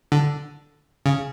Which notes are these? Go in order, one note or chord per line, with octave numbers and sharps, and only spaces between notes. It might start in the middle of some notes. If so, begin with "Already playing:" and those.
D3
C#3